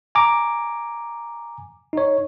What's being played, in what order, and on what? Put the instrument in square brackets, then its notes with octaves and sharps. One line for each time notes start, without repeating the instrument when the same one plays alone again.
[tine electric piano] G#5 A#5 D6
D#4 C#5